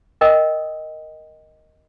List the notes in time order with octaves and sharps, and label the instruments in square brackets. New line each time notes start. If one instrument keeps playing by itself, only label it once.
[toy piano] A#4 D#5 G5 D#6